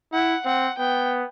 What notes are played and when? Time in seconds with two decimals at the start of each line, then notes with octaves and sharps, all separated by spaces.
0.12 E4 F#5
0.45 C4 F#5
0.77 B3 G5